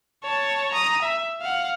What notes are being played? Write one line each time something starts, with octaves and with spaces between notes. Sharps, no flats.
C#5 A5
A#5 D#6
E5
F5 F#5